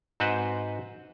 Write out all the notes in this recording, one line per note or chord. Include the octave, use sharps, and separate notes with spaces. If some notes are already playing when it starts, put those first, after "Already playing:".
G#2 C4 F#4 B4 C5